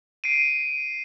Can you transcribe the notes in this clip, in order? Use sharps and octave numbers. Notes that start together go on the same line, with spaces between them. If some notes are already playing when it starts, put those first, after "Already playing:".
C7 D7 D#7